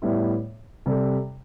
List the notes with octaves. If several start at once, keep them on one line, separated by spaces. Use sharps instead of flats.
A2 G3 B3 E4
C3 G3 A4